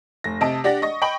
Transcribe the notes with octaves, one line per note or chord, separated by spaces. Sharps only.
F1 A#6
C3 D#5 A5 D7
D4 G4 D5 F#5 A#6
D#5 C#6 A#6
D#5 G5 B5 C#6 F#7